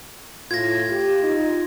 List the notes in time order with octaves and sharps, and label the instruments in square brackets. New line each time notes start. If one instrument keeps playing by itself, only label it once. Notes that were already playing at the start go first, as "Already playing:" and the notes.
[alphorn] A2 [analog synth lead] F4 [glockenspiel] G#6 A#6
[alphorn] G4
D#4